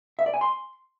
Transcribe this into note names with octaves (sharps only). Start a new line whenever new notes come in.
E5
D5
G#5
C6